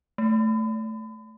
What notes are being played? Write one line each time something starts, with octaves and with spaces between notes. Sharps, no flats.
A3